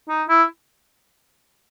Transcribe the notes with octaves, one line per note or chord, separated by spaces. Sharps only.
D#4
E4